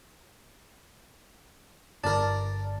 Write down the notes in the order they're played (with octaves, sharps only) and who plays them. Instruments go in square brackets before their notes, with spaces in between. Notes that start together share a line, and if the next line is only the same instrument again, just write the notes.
[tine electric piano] G1 D5 A5 [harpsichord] D4 A#4